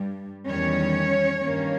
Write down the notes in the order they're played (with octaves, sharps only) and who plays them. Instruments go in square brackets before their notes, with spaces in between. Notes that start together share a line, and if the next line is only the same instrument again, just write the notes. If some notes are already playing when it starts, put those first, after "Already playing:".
Already playing: [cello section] G2 G3
E2 D#3 G3 C#4 C#5
G2 D#3 A#3 C#4